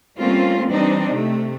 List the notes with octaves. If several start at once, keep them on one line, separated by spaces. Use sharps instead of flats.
G3 A3 A#3 C4 C#4 F4
E3 G3 C4 D4 D#4
C3 A3